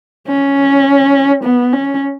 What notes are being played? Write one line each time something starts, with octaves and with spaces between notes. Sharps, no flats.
C#4
B3
C#4